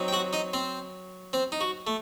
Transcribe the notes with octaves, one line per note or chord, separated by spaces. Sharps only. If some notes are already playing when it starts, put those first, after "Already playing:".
Already playing: F#3 C4 D#4
G5
F#4 F#5
D#4 D#5
C4 C5
C4 C5
D#4
F#4
A3